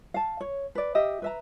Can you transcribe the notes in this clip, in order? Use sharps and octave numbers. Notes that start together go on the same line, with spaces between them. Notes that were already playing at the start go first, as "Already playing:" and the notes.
F5 A5
C#5
B4 D5
G4 D#5 E5
B4 E5 A#5